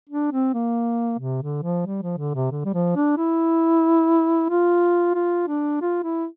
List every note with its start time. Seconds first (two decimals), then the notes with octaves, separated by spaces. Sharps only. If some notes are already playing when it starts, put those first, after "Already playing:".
0.09 D4
0.32 C4
0.54 A#3
1.19 C3
1.42 D3
1.63 F3
1.86 G3
2.02 F3
2.18 D3
2.35 C3
2.51 D3
2.65 G3
2.74 F3
2.96 D4
3.17 E4
4.50 F4
5.15 F4
5.48 D4
5.81 F4
6.03 E4